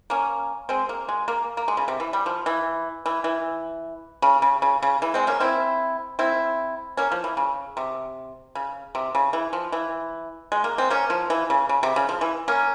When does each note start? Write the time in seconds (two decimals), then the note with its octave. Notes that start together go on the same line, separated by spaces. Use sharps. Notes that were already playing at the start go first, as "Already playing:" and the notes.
0.10 A#3 C#4
0.69 G#3 C4
0.89 A#3
1.09 G#3
1.28 A#3
1.57 A#3
1.68 G#3
1.77 C#3
1.88 C3
2.00 E3
2.13 G3
2.26 F3
2.46 E3
3.06 E3
3.24 E3
4.22 C#3
4.42 C#3
4.62 C#3
4.83 C#3
5.02 E3
5.14 G#3 C4
5.27 A#3 C#4
5.40 C4 E4
6.19 C4 E4
6.97 A#3 C#4
7.12 F3
7.24 E3
7.37 C#3
7.77 C3
8.55 C#3
8.95 C3
9.15 C#3
9.33 E3
9.53 F3
9.72 E3
10.52 G#3
10.64 A#3
10.78 G#3 C4
10.90 A#3 C#4
11.10 F3
11.30 E3
11.50 C#3
11.69 C#3
11.83 C3
11.96 C#3
12.09 F3
12.21 E3
12.48 A#3 C#4